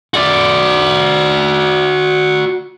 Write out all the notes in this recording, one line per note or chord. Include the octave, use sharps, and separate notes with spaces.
F#4 D5